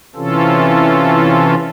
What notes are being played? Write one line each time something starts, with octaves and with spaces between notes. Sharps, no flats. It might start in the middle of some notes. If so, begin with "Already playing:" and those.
C3 E3 C#4 F4 A4